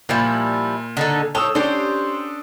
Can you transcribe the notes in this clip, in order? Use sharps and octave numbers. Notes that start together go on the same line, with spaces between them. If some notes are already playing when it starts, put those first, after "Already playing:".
A#2 F3 G3 E4
D3 D#4 A4
A2 C#5 G5 A5 D#6 E6
C#4 D4 G4 A4 C5